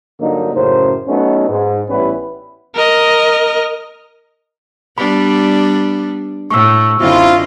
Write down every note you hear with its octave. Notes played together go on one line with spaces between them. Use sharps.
G2 D3 F#3 A#3 D#4
F#2 A2 C#3 A#4 C5
F#3 A3 B3 C#4 D#4
G#2
A1 G3 B3 C#4 E4 B4
A#4 D#5
G3 B3 D4 B5
A2 C#6 E6
F#2 D3 C4 E4 F4 D#5